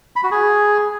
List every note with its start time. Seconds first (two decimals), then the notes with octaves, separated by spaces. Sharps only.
0.16 B5
0.24 F#4
0.31 G#4